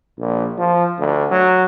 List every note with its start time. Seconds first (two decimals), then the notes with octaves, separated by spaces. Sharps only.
0.19 A#1
0.58 F3
0.99 D2
1.31 F#3